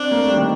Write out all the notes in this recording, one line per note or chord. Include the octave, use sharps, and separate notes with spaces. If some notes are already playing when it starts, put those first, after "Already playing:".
Already playing: C4 D4
A#3
A3
G3
D#3